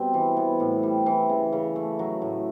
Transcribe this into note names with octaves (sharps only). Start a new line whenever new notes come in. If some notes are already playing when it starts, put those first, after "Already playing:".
Already playing: B2 G3 C4
E3
B3
A2
G3
E3
C#3
C#3
A3
F#3
A2